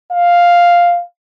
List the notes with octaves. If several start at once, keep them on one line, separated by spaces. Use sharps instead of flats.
F5